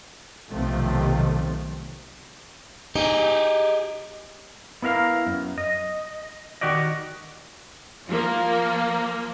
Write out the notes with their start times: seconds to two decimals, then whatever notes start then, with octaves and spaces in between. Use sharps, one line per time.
0.50 B1 C3 D#3 F3 A3
2.96 D#4 G4 G#4 D#5
4.82 B3 E4 A#4 F5
5.26 F#2
5.58 D#5
6.61 D#3 F#4 G4 D5 D#5
8.07 F3 A#3